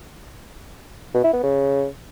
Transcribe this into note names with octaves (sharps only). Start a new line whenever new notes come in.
B2
E4
B3
C#3